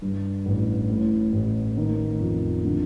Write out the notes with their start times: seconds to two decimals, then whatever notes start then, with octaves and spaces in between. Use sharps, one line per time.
0.02 G2
0.46 A1
0.90 A2
1.32 A1
1.77 D#3
2.20 F2
2.64 D3